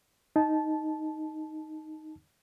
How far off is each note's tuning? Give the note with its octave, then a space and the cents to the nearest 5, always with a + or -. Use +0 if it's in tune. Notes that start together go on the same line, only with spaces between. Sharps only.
D#4 +0 A5 -15